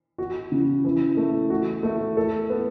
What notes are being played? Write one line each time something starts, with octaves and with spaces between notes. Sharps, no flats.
F#4
C#3
E3
A3
F#4
A3
A4
B3